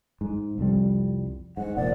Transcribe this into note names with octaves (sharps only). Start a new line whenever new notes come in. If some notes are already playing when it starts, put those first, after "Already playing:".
G#2
C2 F2 G3
G#2 F#5
F1 A#2 F3 D5